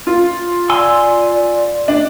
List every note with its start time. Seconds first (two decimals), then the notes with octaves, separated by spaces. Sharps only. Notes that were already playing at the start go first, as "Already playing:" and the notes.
0.07 F4
0.70 D5 G#5 C6 E6
1.88 D4